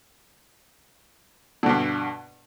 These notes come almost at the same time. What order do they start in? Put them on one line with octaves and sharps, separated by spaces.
D3 B2 G2